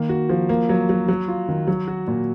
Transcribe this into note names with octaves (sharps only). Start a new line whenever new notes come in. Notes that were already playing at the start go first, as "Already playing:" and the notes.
Already playing: D#3 A#3
F#4
F3
A#3
F#3
F#3
F#3
F4
D#3
F#3
F#4
A#2